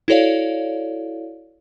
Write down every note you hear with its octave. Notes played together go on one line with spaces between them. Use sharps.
E4 F#4 A4 C#5 D5 F5